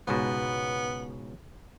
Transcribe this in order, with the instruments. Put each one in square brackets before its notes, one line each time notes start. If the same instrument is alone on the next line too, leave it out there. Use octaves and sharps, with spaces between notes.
[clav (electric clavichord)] C#2 G#2 B2 [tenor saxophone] B3